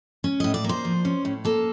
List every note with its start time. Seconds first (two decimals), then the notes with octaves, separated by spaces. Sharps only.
0.24 C#4
0.40 A2 D#5
0.54 D5
0.64 A#3 C5
0.85 F3
1.05 C#4
1.25 A2
1.45 A#3 A4